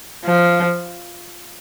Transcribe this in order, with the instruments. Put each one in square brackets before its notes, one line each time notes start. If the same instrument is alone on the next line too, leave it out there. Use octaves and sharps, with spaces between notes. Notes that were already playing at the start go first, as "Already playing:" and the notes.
[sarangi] F3